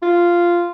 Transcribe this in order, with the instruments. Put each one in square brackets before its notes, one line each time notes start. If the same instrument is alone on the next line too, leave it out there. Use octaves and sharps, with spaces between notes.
[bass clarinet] F4